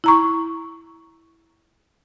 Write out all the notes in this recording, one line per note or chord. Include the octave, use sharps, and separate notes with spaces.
E4 A#5 C#6